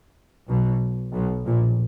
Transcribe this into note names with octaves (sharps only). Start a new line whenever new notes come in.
B1 B2
B1 B2
A#1 A#2